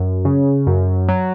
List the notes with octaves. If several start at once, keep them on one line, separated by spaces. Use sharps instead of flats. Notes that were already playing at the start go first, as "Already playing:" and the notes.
Already playing: F#2
C#3
F#2
F#3